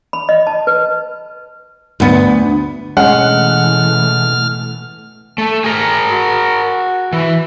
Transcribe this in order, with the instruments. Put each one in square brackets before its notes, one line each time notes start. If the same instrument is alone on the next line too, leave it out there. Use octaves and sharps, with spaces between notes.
[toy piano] B5
D#5
A5
B4
[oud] D2 B3
[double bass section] B2 E3 A3 [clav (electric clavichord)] G#3 C#4 [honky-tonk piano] F#5 [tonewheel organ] F6
[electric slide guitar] A3
G#4 A#4
[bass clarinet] F#4
[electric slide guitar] E3